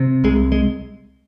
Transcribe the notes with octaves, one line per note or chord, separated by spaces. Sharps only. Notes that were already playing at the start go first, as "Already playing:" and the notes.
Already playing: C3
C2 G#3
G#3